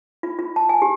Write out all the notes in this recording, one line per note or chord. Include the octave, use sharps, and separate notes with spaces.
F4
F4
A5
G#5
G4